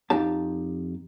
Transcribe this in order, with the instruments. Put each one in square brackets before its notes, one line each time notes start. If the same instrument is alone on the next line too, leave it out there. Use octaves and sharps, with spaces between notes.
[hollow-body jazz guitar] F2 D#4 G4 A5